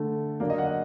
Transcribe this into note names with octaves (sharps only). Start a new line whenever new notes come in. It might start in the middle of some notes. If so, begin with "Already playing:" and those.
Already playing: D3 A3
D3 F#3 A#3 D5
D#5
F#5
D#5